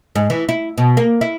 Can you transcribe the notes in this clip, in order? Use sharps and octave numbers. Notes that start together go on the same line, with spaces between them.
G#2
E3
E4
B2
A#3
E4